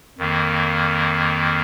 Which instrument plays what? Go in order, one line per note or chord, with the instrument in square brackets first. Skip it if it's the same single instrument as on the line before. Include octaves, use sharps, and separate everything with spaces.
[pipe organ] F2 D#3 A#3